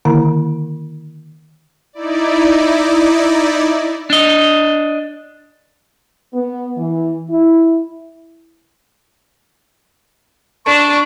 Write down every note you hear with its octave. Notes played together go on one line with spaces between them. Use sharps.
D3 D#3 A#3 E4 A#5
D#4 E4 D5
D4 D#5
B3
E3
E4
D4 C#6